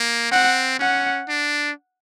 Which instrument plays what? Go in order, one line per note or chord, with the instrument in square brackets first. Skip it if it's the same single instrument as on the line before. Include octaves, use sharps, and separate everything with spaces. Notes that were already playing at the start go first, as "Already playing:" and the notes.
Already playing: [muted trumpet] A#3
[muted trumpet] C4 [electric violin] F#5
[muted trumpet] C#4 [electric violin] F#5
[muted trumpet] D4